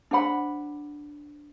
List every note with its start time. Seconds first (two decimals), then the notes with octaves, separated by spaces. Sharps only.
0.11 D4 C5 F#5 B5